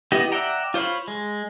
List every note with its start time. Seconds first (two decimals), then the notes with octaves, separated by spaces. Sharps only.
0.12 B3 E4 G4 D#5
0.32 D5 E5 F#5 G5 A#5
0.74 F4 C5 C#5 F5 B5
1.08 G#3